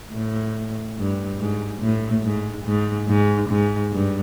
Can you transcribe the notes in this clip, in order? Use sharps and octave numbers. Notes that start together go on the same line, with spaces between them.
A2
G2
G#2
A2
G#2
G#2
G#2
G#2
G2